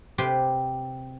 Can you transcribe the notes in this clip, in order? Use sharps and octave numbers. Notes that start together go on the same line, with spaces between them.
C3 G4 B4 C6